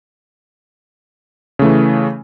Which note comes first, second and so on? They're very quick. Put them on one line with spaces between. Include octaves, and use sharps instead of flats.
C#3 A3 E3